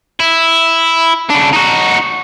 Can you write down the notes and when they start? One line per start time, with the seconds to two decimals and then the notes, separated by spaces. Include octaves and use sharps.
0.20 E4
1.30 C#3 D4
1.53 D#4 F#4